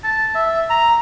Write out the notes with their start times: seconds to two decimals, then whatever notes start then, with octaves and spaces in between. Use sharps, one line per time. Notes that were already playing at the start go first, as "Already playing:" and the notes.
0.04 A5
0.35 E5
0.70 A#5